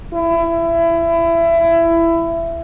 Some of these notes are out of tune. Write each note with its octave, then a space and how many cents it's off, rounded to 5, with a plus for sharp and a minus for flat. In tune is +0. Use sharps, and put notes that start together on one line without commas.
E4 +20